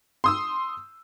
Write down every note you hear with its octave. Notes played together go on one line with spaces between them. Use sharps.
C6 D#6 E6